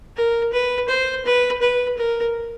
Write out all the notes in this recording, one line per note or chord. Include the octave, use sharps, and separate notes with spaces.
A#4
B4
C5
B4
B4
A#4